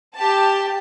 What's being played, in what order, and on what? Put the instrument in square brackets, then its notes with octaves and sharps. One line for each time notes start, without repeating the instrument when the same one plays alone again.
[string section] G4 A5